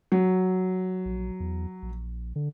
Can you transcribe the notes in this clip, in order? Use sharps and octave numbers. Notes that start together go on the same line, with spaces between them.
F#3
A#1
E2
A#1
D3